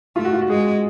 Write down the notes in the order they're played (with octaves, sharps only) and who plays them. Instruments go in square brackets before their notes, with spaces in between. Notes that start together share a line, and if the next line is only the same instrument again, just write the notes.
[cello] A3 [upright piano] F4
[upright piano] F#4
F4
F#4
[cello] G#3 [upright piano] G#4